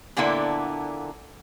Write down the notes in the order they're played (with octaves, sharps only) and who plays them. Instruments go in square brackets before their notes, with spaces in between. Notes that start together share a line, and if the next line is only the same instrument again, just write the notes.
[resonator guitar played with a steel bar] A#2 D3 A#3 B3 E4 A4